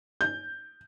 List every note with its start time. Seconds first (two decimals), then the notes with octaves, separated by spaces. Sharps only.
0.21 G6